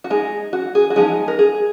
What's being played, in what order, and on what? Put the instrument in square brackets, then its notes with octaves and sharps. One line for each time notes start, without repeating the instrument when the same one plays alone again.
[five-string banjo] F#4
G#3 D#4 G#4
F#4
G#4
F#4
F3 G#3 B3 D#4 G#4
A#4
G#4